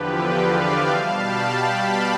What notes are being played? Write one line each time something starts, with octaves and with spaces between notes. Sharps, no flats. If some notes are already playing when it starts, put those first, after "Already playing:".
Already playing: E2 D3 F3 G4 B4
D5 F5
E5 G5
B2 G3 F5 A5
G5 B5
G5 B5
F5 A5